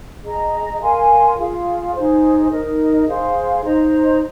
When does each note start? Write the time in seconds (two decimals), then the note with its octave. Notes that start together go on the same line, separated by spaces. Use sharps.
0.24 G#4 D#5 A#5
0.81 A#4 F5 G#5 C6
1.37 F4 G#4 F5
1.95 D#4 G#4 C5
2.51 D#4 A#4 D#5
3.08 G#4 C5 F5 C6
3.65 D#4 C5 D#5 A#5